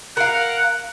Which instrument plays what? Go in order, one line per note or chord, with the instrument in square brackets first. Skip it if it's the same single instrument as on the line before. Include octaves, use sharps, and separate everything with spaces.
[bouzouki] A#4 F5 [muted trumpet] F#5